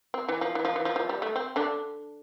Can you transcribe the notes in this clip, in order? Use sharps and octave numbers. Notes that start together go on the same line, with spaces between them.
C4
E3
F3
E3
F3
E3
F3
F3
G3
A3
C4
D3 D4